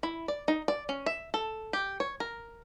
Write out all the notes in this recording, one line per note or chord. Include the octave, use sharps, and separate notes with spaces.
E4
D5
D#4
D5
C#4
E5
A4
G4
C#5
A#4